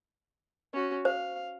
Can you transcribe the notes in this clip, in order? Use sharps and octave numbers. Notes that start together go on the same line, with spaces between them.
C#4 F#4
C5 F5